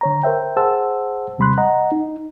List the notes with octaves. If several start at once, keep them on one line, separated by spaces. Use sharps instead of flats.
D3 C#5 A#5
A#4 C5 E5 G5
G#4 C5 F#5 A5 E6
D#2 C3 G3 B5 C6 F#6
D#5 F#5 A#5
D#4